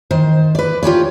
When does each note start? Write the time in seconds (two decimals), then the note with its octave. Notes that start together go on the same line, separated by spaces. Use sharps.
0.11 D#3 C5
0.55 B4 D5
0.83 F4 G4 C#5 D5